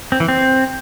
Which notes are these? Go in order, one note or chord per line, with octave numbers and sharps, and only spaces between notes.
C4
E3
C4